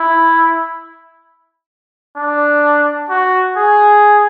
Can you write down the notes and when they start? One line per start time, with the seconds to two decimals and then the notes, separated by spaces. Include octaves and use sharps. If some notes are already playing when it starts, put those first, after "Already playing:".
Already playing: E4
2.16 D4
3.09 F#4
3.57 G#4